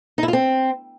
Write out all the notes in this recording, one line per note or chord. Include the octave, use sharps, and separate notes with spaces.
D#4
E4
F4
C4